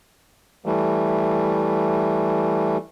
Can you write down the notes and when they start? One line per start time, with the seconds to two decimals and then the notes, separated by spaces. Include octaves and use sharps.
0.66 E3 G3 A3